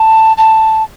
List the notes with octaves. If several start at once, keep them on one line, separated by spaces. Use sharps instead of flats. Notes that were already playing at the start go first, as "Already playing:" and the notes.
Already playing: A5
A5